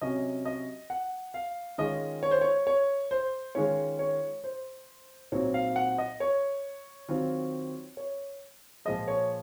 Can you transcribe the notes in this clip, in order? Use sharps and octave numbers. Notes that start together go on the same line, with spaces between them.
C3 F#3 C#4 D#5
D#5
F#5
F5
D#3 G#3 C#4 F4 D#5
C#5
C5
C#5
C#5
C5
D#3 G#3 C#4 F4 C#5
C#5
C5
A#2 F#3 C4 D#4 C#5
F5
F#5
D#5
C#5
D#3 F#3 C4 F4
C#5
A#2 F3 G#3 D#5
C#5